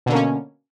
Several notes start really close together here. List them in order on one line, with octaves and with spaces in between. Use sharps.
B2 D3 A#3 C#4